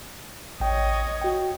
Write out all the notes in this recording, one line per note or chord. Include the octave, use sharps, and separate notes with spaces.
A1 C#5 D#5 G5
F#4 G5